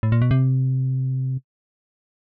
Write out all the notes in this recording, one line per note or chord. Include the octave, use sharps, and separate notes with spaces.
A2
A#2
B2
C3